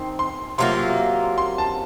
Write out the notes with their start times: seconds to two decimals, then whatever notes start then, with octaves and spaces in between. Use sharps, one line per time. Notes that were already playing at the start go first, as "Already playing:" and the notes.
Already playing: D#3 C4 C6
0.19 C6
0.58 C3 F#3 A#3 F4 C6
1.38 C6
1.58 A5